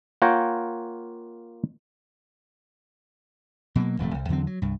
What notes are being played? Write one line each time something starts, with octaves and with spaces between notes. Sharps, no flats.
A#3 F4 C#5 F#5 G5 A#5
B2 F#3 G#3 A#3
D#1 F2 C3 A3
C2
E2 D3 F#3 C4
F#3
C2 G2